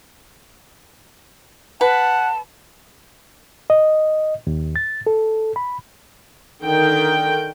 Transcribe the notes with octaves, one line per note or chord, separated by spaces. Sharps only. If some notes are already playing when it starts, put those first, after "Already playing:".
B4 F#5 A5
D#5
D#2
A6
A4
B5
D3 D#3 A#4 G5